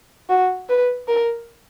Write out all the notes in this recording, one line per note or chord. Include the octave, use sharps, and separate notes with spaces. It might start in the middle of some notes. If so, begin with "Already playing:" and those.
F#4
B4
A#4